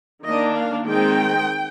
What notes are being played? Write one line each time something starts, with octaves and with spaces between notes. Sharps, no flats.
D#3 A#3 D4 D#5
F5
D#3 G#3 C4 G5